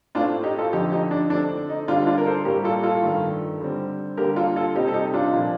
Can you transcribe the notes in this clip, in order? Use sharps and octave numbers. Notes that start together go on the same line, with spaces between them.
A2 A3 C4 D4 F4
D#4 G4
F4 A4
F2 D3 F3 D#4 G4
D#4 G4
D4
D3 A3 C4 D4
D#4
D3 G3 C4 D4 F4
D4 F4
A#4
A4 C5
A2 G3 A#3 G4 A#4
F4 A4
F4 A4
G2 D#3 A3
D3 G3 C4
D3 G3 A#3 G4 A#4
F4 A4
F4 A4
C3 G3 C4 D#4 G4
A4
D#4 G4
D4 F4
A#2 F3 C4